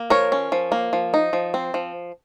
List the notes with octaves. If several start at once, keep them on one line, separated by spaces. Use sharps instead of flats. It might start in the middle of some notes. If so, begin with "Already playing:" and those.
Already playing: A#3
F3 A#4 C#5
C#4
F3
A#3
F3
D#4
F3
C4
F3